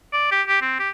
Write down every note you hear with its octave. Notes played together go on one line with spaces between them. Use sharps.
D5
G4
G4
C4
G4